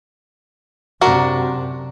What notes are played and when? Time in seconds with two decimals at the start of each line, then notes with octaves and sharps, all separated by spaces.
1.01 F#2 C3 D4 F#4 A#4